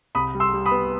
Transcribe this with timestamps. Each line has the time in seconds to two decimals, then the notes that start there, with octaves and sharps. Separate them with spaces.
0.15 C2 B5 D#6
0.35 G3
0.40 C6 E6
0.54 G3
0.66 B5 D#6
0.71 B3